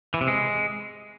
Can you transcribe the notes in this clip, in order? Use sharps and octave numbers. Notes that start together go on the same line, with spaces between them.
E3
C3
G#3